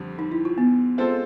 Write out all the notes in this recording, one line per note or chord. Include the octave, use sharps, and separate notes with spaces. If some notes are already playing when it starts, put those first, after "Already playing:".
Already playing: F2 D3 G3 C4
D#4
E4
F4
B3
G#3 C4 F4 A4 C5